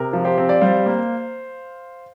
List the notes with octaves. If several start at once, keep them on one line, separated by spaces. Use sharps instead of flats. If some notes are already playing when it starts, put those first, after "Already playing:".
Already playing: C3 A#4
F3
G4 C5
C4
D5
G3 C5 F5
A#3